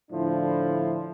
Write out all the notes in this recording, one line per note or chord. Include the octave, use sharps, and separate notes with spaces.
A2 D3 F3 D4 E4